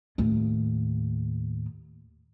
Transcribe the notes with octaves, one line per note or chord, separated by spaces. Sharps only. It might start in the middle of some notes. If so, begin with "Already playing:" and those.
D#2 A2